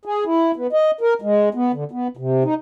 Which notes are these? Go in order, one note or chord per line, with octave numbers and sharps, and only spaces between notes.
G#4
E4
B3
D#5
A#4
G#3
B3
D3
B3
C3
D#4